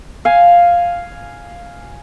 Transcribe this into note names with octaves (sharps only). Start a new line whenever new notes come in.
F5 G#5